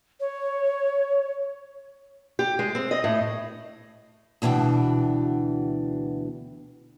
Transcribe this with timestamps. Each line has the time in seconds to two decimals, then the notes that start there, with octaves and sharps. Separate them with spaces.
0.20 C#5
2.39 G4
2.59 G#3
2.75 C4
2.91 D#5
3.04 A2
4.42 D2 B2 E3 D4 G5